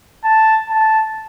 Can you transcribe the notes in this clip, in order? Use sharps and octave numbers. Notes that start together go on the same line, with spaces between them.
A5
A5